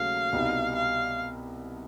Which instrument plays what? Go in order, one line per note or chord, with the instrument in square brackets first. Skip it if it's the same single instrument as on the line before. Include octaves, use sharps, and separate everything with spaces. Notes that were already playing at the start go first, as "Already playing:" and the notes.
Already playing: [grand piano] D#2 C#3 F#3 A3 [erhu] F5
[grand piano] C2 B2 G3 B3 D#4
[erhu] F5